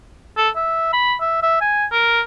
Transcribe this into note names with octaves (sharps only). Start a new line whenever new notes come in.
A4
E5
B5
E5
E5
G#5
A#4